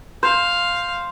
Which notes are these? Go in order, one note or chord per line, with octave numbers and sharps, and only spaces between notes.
C5 F5